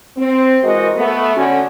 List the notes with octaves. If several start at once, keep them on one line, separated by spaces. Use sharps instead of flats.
C4
E3 G#3 F#4 A#4 C5 D#5
A3 B3
D3 C#4 F#4